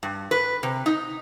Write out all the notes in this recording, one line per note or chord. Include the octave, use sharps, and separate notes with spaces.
G2
B4
C3
D#4